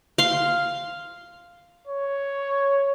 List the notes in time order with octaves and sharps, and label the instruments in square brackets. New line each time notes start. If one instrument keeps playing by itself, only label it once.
[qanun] F5 C6
[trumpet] C#5